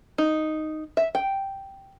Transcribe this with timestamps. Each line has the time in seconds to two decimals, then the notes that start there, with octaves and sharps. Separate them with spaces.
0.18 D#4
0.97 E5
1.15 G5